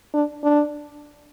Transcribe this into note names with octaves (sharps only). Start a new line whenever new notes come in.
D4
D4